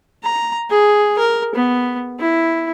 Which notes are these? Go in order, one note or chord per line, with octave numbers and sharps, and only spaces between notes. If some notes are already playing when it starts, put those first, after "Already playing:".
A#5
G#4
A#4
B3
E4